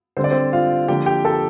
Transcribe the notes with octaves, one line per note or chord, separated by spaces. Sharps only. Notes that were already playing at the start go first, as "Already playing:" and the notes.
D3 G3 C4 C5
D5
C4 C5
F4 F5
D3 F3 A#3 G4 G5
G4 G5
A4 A5